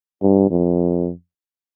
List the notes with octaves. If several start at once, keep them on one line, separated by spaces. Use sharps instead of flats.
G2
F2